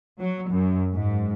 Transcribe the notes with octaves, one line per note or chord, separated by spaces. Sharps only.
F#3
F#2
G#2